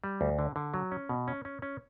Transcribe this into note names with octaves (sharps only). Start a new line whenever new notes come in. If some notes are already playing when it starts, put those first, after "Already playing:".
G3
D2
D3
D3
F#3
C#4
B2
C#4
C#4
C#4